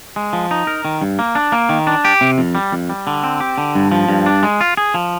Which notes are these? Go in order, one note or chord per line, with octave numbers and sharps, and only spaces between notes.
G#3
F3
D#4
A#4
D#3
G2
A#3
D4
A#3
D#3
D4
G4
C3
F2
G3
F2
G3
D3
C4
G4
D3
G2
F3
G2
D4
G#3
F4
G#4
F3